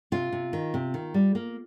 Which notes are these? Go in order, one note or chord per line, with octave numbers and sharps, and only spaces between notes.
C3 F4
C3
D#3
C3
D#3
G3
A#3